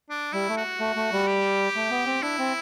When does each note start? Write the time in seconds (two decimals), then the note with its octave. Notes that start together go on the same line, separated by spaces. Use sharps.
0.10 D4
0.33 G3 E4
0.49 A3
0.57 F#4
0.80 A3
0.96 A3
1.12 G3
1.27 G4
1.76 A3
1.90 B3
2.06 C4
2.22 D4 E4
2.39 C4